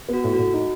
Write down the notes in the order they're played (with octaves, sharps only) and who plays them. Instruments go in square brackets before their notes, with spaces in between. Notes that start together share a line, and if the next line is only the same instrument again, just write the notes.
[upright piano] B3 [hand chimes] F#4
[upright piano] A2
[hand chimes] F#4
[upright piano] A2
[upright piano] D#4 [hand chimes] F#4